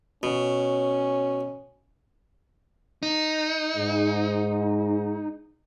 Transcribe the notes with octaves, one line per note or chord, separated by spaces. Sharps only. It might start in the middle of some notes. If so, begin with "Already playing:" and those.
B2 C#4
D#4
G#2